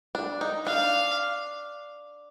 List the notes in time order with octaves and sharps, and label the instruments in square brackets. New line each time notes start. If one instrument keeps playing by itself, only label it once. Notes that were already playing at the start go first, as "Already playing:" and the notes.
[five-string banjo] D4
D#4
[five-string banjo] D4 [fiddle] F5